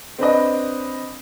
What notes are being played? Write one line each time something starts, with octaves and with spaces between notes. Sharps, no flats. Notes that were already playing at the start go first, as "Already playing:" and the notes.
C4 D4 B4 D#5